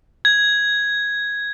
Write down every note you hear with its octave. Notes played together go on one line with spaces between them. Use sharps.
G#6